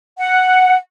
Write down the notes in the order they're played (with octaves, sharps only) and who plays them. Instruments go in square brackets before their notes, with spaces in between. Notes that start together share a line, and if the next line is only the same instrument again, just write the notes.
[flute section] F#5